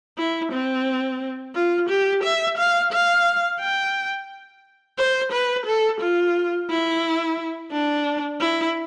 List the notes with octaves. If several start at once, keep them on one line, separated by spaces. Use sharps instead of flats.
E4
C4
F4
G4
E5
F5
F5
G5
C5
B4
A4
F4
E4
D4
E4